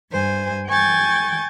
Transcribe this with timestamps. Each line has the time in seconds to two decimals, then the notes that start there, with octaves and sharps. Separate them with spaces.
0.11 G2 C5 G#5
0.67 G5 G#5 C#6 G6 A6